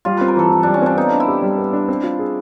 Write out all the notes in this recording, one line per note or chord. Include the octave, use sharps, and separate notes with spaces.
G3 F4
C4 B4
A#4
E3 A4
E3
G3 D4
C#4
C4 D4
B3 D#4
D4
E4
G4
G3
B3
D4
C4
F4
G#4